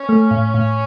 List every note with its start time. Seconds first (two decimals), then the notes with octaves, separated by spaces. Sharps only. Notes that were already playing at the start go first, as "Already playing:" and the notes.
Already playing: C#4
0.09 A3
0.31 A2
0.54 A2